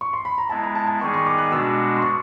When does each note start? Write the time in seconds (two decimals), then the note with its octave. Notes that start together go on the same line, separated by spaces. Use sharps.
0.01 C#6
0.13 C6
0.25 B5
0.38 A#5
0.49 G#3 B3 E4 A5
0.63 A#5
0.75 A5
0.88 A5
1.01 D#3 G3 B3 D#4 G#4 C#6
1.14 C#6
1.26 D6
1.38 F#6
1.52 B2 G#3 B3 D4 F#4 E6
1.96 C6
2.02 C#6